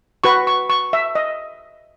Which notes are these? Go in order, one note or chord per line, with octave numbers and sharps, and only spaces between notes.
F#4 B4 C#6
C#6
C#6
E5
D#5